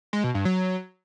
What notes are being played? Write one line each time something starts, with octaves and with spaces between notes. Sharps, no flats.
G#3
B2
G2
F#3